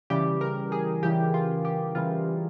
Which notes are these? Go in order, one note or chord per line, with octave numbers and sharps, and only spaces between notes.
C#3 E3 G3 G4
A#4
G#4
C#3 E3 G3 G4
F4
G4
C#3 E3 G3 F4